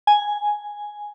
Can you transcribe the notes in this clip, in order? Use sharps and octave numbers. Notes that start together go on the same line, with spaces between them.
G#5